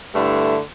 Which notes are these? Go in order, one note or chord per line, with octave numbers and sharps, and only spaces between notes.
G2 D3 A3 E4